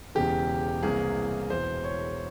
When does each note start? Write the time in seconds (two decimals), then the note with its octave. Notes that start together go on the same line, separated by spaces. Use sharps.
0.15 E1 E2 C#3 E3 G4
0.83 C2 C3 E3 A#3 G#4
1.50 E1 E2 E3 C5
1.84 C#5